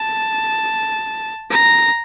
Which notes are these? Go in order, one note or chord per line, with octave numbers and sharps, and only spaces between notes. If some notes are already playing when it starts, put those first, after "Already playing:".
Already playing: A5
A#5